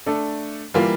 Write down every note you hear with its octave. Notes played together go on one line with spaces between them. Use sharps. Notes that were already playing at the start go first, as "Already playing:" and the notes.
A3 D4 A4
E3 G3 A#3 F4